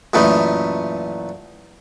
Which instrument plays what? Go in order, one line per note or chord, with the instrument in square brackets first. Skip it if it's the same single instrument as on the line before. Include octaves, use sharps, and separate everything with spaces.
[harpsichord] F#2 A#2 E3 A3 D#4